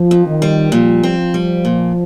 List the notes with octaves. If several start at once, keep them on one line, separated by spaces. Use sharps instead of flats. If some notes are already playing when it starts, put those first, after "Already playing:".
Already playing: F3
F2
D#3
G3
A#2 F3
C4
G3
A#2